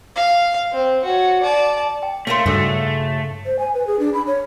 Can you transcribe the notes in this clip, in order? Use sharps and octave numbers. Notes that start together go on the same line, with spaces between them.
F5
C4
F#4 C#5
D5 A5
G5
A3 C#4 F4 A#4 C#5 C6
G2 C#3 D#4 F#4 A4 C#5 E6
C5
G#5
B4
G#4
D4
B5
C#5